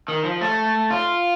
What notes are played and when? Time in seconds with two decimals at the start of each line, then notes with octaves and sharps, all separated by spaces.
0.08 D#3
0.25 F3
0.41 A3
0.90 F4